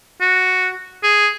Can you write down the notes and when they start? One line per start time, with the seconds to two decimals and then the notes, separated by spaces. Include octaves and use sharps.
0.21 F#4
1.03 G#4